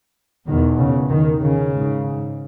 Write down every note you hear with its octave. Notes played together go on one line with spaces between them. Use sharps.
E2 B2 D#3
C#3
D#3
C#3
G#2